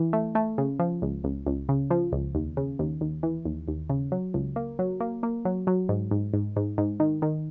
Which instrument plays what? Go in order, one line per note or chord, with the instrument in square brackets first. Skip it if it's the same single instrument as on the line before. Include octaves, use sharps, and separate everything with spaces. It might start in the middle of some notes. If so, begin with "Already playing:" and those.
Already playing: [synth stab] E3
A3
A3
C#3
F3
C#2
C#2
C#2
C#3
F3
C#2
D#2
C#3
D#2
D#2
E3
D#2
D#2
C#3
F#3
C#2
A#3
F#3
A#3
A#3
F#3
F#3
G#2
G#2
G#2
G#2
G#2
D#3
D#3